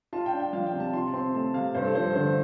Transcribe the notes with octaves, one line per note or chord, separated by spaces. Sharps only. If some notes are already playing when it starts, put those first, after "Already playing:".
F4 A5
G5
D4
G5
F3 F5
G5
C3
A5
F4 C6
A5
C4 C6
A3 A5
C3 F5
G2 C5
A4
F3 C5
A4
D3 C5